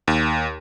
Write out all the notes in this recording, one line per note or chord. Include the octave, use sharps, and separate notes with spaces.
D#2